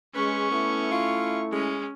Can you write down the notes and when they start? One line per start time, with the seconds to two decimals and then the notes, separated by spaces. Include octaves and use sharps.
0.15 G#3 C#4 B4 C#6
0.51 A3 B3 E4
0.91 F4
1.52 G#3 C#4